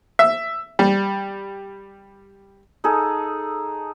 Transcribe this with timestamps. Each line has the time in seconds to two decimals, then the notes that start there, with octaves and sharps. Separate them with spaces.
0.19 E5
0.79 G3
2.84 D#4 G#4 A4